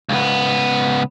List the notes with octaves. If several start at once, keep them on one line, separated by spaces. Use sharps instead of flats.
C#2 B3